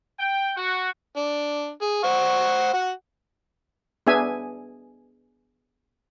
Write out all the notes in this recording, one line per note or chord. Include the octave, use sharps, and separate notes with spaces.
G5
F#4
D4
G#4
C5 F#5 C#6
F#4 F#5
B3 D4 G#4 E5 G#5